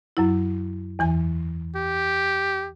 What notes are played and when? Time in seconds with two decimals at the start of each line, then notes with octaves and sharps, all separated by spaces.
0.17 F#2 F#3 E4
0.99 E2 E3 G#5
1.76 G4